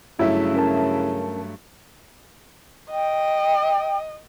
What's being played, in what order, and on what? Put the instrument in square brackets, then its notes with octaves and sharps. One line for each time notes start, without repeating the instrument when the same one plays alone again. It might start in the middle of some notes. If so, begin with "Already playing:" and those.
[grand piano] G2 F#3 A3 [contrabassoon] C#3 [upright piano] E4 E5
[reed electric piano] C#4 A#4 A5
[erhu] D#5 [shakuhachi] G5